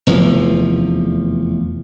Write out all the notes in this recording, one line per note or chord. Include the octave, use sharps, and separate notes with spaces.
F1 E2 F3